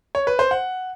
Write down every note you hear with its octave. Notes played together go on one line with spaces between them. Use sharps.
C#5
B4
C5
F#5